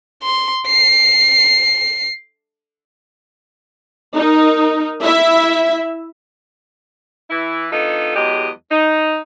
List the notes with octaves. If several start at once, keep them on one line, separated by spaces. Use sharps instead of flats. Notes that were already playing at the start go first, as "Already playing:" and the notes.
C6
C7
D#4 A#4
E4 E5
E3 E4
D3 B3 D#4 F4 A4
E2 F#3 G#3 G4 D#5
D#4